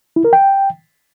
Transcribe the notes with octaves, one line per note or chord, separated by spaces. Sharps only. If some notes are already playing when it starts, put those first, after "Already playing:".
E4
A#4
G5